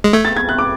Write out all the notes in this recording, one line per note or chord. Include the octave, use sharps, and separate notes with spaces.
G#3
A3 G#6
A6
G#6
F#6
D6